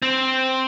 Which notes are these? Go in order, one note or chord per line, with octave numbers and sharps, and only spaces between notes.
C4